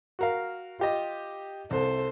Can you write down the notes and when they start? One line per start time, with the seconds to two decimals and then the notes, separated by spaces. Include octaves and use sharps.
0.19 F#4 A#4 F5
0.79 F4 G4 D#5
1.71 C2 A4 C5